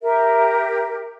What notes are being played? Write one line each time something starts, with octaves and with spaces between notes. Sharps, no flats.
G4 A#4 E5